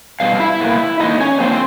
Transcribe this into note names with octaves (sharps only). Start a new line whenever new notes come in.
B2 G3 F5
F5
E4 E5
B2 G3 A#3
D3 F3 A#3 D#4 D#5
C#4 C#5
D3 F3 A#3 C4 C5